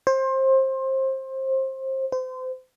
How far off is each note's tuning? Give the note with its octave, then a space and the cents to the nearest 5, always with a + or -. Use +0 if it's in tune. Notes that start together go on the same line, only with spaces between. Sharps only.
C5 +25
C5 -30